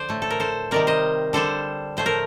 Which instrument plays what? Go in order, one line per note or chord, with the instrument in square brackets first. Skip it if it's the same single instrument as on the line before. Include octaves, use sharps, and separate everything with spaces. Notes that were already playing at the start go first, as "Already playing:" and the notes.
Already playing: [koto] D3 F3 C5 D5
A2 A3
A4
A#4
A4 C5
C3 D#3 G3 A#4 D5
C5 D#5
D3 G3 A4 C5
A2 F3 A3 C5
A#4